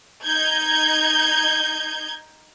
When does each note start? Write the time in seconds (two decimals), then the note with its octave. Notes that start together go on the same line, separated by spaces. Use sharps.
0.24 D#4 G6 G#6